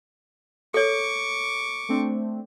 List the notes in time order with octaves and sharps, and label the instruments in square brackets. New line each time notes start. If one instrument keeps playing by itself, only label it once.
[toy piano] A4 C#5 [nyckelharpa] C#6 D6
[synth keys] A3 C4 D4